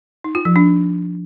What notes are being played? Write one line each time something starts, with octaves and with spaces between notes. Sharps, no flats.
D#4
F4
F3
D4